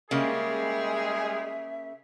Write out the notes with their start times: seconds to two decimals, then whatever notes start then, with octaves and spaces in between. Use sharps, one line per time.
0.11 C#3 G3 G#3 A#3 G#4 E5